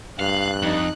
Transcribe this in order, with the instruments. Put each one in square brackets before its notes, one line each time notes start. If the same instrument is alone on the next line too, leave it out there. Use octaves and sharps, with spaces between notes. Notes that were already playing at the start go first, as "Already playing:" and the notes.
[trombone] G2 [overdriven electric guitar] F5 [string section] F#6
[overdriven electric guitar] F2 [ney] D#4